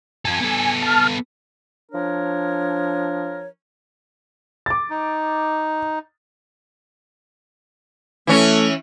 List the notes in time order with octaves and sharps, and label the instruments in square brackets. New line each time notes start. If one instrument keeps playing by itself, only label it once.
[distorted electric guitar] F4 A4 [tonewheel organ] G#5
[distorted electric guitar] B3 A4
[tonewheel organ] A5 F6
[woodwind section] F3 D4 A#4 C#5
[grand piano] D6 A6
[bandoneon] D#4
[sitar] E3 C#4 [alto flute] A3